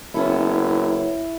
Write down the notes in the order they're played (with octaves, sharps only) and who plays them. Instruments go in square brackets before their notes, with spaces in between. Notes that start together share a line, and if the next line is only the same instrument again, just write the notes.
[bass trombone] F#1 [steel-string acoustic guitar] B3 C#4 A4 [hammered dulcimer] E4